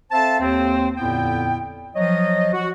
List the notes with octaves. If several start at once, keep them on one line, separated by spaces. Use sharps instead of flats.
C4 A4 C5 E5 F5 A5
D#2 C4
F2 A#2 D3 B3 E4 G5
F3 F#3 C#5 D#5
F#4